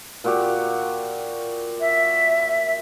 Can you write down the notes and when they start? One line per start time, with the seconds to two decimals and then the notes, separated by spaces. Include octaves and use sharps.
0.24 A#2 F#4 G4
1.80 E5